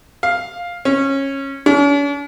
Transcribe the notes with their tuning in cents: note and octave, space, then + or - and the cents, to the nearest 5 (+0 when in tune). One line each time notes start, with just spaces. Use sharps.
F5 +0
C#4 -20
C#4 +45